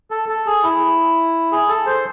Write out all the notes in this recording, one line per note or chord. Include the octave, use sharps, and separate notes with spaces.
A4
A4
G#4
E4
G#4
A4
C5